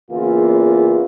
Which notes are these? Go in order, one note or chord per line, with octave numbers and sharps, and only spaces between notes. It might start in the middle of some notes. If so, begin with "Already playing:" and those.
E2 C#3 A#3 F4